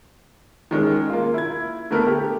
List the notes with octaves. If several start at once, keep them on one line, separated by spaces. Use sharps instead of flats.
D#3 G#3 C#4
A#3 F4
E4 G#6
D3 A3 B3 A#4 B4
G4